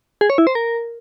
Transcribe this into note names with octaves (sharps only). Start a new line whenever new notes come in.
G#4
C#5
E4
C5
A#4